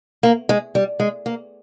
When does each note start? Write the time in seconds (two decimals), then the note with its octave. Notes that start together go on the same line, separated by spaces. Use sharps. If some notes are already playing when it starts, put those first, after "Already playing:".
0.23 A#3
0.49 G#3
0.75 G3
1.00 G#3
1.26 A#3